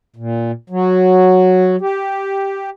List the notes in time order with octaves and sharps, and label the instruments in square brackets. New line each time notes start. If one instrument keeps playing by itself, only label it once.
[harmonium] A#2
F#3
G4